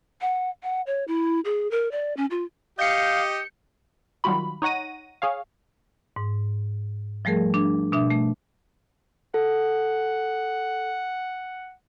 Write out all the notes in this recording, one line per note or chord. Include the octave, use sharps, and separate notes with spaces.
F#5
F#5
C#5
E4
G#4
A#4
D5
C#4
F4
G4 D#5 F5 G6 C#7
D#3 F#3 G3 F4 F#4 B5
D#4 C#5 F#5 A#6 D#7
G#4 C#5 F5
G#2
F3 G3 A3 G#4 A#4
D4
B2 D4 E5
A3
A4 F#5